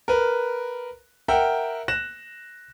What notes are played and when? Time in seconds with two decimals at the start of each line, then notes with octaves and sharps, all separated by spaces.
0.08 A#4 B4
1.28 A#4 E5 F#5 G5
1.88 F#6 A#6 E7